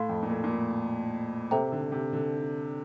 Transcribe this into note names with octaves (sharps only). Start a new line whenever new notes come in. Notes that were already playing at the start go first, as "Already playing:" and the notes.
Already playing: A2 F5 C6
F2
A#2
A2
A#2
A2
C3 A4 C5 E5 G5 A#5
D3
C3
D3